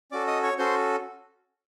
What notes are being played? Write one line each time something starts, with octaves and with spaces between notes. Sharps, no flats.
C#4 F#4 A4 D5 D6
D#5 D#6
C#5 C#6
C#4 F#4 A4 C5 C6